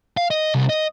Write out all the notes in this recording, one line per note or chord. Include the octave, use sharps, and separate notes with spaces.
F5
D#5
C2
D#5